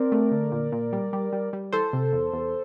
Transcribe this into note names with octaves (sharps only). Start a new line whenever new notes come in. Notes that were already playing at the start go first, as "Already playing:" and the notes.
Already playing: C4 A#4 D5
A3
D3
A#2
A#2
G3
G3
G3
G3
E3 A4 C5
C3
E2
E2